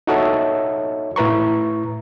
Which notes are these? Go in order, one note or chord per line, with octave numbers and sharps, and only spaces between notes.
D#4 F#4 A4 C#5 E5
A2 E4 B4 A#5 C#6